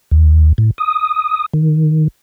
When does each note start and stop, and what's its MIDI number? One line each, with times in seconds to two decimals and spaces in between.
0.11 0.53 39
0.58 0.71 45
0.78 1.46 87
1.54 2.08 51